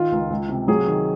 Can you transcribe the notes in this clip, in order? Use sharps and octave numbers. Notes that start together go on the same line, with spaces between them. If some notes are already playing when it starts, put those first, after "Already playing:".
Already playing: D#3 F4
C#2
C#2
C3
F#3 G#4
D#3